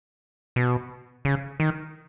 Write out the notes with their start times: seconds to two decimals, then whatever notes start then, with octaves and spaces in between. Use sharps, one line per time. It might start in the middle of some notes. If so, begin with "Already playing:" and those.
0.56 B2
1.25 C#3
1.60 D#3